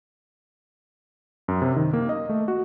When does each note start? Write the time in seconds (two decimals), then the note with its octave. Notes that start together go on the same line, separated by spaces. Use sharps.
1.48 F#2
1.62 C3
1.76 D#3
1.93 A#3
2.09 D#5
2.29 A3
2.48 F#4